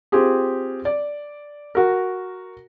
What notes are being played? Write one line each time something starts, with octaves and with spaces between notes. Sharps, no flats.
C4 F4 G4 G#4
D5
F#4 A#4